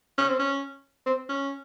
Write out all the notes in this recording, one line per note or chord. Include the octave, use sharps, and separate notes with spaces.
C#4
C4
C#4
C4
C#4